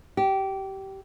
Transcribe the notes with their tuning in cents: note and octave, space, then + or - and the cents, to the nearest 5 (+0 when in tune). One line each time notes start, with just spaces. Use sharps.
G4 -20